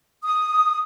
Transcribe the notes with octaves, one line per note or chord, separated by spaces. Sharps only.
D#6